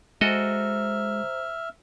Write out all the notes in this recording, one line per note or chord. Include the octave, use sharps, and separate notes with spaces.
G#3 F#4 A4 C5 D#5 E5 A#5 F6